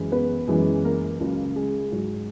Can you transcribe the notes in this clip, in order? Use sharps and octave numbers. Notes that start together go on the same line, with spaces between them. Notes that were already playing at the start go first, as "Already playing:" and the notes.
Already playing: F#2 E3 G#3
B3 B4
F#2 E3 G#3
A#3 A#4
C#2 C#3 F#3
G#3 G#4
G#2 F#3